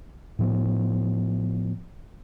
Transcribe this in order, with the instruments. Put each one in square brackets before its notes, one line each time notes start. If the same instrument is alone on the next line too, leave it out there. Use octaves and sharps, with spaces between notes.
[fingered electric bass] A2 F3 B3